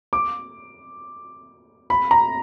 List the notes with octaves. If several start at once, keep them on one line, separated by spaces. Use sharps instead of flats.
D6
B5
A#5